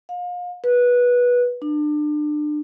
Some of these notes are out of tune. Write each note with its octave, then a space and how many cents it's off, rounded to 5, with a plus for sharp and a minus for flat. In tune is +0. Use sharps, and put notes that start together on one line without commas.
F5 +35
B4 -15
D4 +30